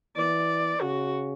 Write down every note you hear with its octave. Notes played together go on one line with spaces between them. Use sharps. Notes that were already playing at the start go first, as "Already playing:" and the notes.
E3 D5
C#3 F#4